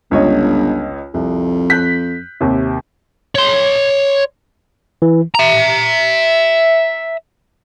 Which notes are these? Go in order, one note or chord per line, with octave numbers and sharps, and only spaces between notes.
G1 C#2 C#5 D#5
C2 F2
F#6 G6 B6
D#2 C3
C#5 C6
E3
E5 A#5